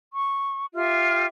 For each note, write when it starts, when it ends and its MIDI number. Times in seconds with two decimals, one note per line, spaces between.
0.14 0.65 85
0.74 1.27 65
0.74 1.27 67
0.74 1.27 76
0.74 1.27 89